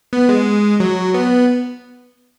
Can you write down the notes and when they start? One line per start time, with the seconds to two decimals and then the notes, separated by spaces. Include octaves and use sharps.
0.13 B3
0.29 G#3
0.80 F#3
1.14 B3